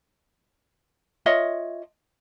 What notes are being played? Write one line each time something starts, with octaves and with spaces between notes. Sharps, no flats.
F4 C#5 D#5 E5